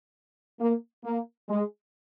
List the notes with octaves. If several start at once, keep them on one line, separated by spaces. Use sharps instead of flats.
A#3
A#3
G#3